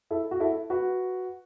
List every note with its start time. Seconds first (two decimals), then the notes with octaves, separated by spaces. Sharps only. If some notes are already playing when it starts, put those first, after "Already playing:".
0.10 E4 A4
0.31 F#4
0.40 E4 A4
0.70 F#4 B4